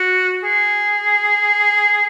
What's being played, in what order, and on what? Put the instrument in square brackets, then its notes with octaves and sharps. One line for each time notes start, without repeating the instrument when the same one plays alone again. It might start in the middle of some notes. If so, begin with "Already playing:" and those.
Already playing: [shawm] F#4
G#4